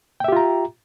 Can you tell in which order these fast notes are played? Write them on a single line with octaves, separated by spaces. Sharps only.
G5 E5 G4 F4 A#5